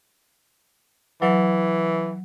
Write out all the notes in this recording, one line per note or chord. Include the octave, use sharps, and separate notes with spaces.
E3 F#3